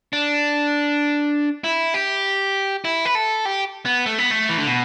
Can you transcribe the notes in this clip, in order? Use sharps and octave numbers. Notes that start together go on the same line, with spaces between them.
D4
E4
G4
E4
B4
A4
G4
B3
A3
B3
A3
E3
D3
B2